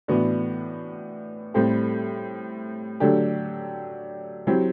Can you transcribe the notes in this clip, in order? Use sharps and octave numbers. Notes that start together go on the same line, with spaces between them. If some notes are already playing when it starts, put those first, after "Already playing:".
A2 E3 B3 D4 F#4
A2 G3 C4 G4
D3 F#3 A3 D4 G4
F#3 C4 E4 G4